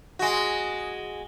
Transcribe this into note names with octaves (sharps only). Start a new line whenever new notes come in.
G#3 F#4